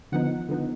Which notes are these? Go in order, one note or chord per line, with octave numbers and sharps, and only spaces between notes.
D3 F3 B3 D#4 F#5
D3 F3 B3 D#4